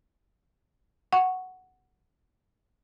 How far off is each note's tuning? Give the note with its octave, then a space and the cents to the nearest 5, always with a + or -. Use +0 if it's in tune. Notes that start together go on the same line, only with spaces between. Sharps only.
F#5 +0 C#6 +0